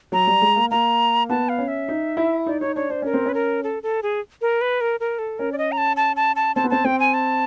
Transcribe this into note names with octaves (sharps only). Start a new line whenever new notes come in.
F#3 A#5
G3
G#3
A#3
A#3 A#5
B3 A5
F5
C#4
E5
D#4
E4
D#4 D5
D#4 C#5
D4 C#5
D4 C5
C#4 A#4
C4
C#4 B4
A#4
A4
A4
G#4
A#4
B4
A#4
A#4
A4
C#4 A#4
D5
D#5
A#5
A5
A5
A5
A5
C4 A5
B3
C4 A5
C4 G5
G#5
A5